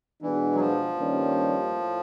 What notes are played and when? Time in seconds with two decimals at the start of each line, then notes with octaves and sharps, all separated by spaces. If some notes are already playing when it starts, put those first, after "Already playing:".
0.22 B2 E3 G#3 B3 D4
0.55 F#3
0.60 F3
0.97 G2 D#3 G3 A#3 C#4
1.72 A2